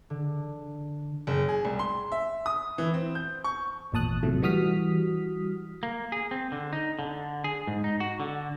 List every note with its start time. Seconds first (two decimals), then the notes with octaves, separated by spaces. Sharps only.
0.10 D3
1.27 F#1
1.48 G#4
1.65 C2
1.79 C6
2.12 E5
2.46 D#6
2.78 E3
2.94 C4
3.15 G6
3.44 C#6
3.92 G#1 E2 A#2 A5 D#6 F#6
4.23 A2 C3 F3 F#3 A3
4.42 E3 G3 F#4 D#6 F6 B6
5.83 A#3
6.12 G#4
6.31 C4
6.52 D3
6.73 D#4
6.99 D3
7.44 G#4
7.67 G#2
7.84 D#4
8.00 F#4
8.20 D3